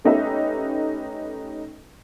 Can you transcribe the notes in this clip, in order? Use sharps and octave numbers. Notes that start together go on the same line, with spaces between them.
A3 C#4 D#4 G4 B4 E5